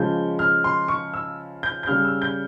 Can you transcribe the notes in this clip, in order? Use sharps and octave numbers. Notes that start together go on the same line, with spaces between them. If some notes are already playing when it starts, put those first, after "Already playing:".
Already playing: C#3 F3 G#3 G6
F6
C6
C#6
E6
G6
G6
C#3 G3 F6
E6
G6